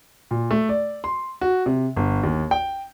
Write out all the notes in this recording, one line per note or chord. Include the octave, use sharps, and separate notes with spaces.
A#2
A3
D5
C6
F#4
C3
G1
D#2
G5